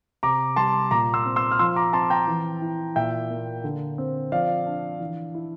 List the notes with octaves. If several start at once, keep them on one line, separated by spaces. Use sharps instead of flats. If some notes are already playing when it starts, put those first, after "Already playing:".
C3 A#5 D6
G3 A5 C6
A#2 A#5 D6
C6 E6
C4
C6 E6
F6
F3 C6 E6
A#5 D6
C4 A5 C6
G5 A#5
E3
E4
A#2 E5 G5
A#3
D3
C4
F3 D5 F5
D4
E3
E4